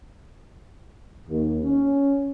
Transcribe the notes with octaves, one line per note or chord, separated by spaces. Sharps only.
D#2
C#4